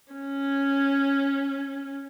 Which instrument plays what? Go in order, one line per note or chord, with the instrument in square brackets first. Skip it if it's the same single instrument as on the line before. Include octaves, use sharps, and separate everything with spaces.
[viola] C#4